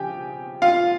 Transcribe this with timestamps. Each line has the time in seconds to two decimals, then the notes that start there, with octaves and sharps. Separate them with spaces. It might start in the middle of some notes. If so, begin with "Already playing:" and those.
Already playing: C#3 F3 G4 G5 G#5
0.62 F4 F5